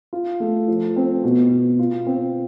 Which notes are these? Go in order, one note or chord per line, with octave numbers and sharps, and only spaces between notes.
F4
A3
F3
C4
B2
B2
F4
C4